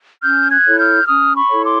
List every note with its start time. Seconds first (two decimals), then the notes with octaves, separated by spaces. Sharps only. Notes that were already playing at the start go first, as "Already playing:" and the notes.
0.22 C#4 F6 G6
0.50 F#6 G#6
0.65 E4 A4 C#5
0.79 F6 G6
1.07 C#4 D#6 F6
1.35 B5 C#6
1.49 E4 A4 C#5
1.64 C6 D6